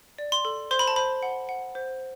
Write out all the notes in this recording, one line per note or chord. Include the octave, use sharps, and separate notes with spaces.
D5
C6
A4
C5 C6
B5
A5
C5 B5
F#5
F#5
C5